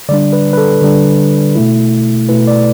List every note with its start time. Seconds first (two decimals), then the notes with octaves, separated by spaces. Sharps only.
0.09 D3 G3 D4 D5
0.33 B4
0.53 B4
0.57 A4
0.82 D3 G3 D4
1.56 B2 A3 E4
2.29 B2 A3 E4 B4
2.47 D5